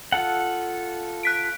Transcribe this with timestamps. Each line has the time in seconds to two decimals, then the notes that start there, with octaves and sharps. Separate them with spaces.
0.12 F4 A4 F#5
1.23 F#6 B6 D7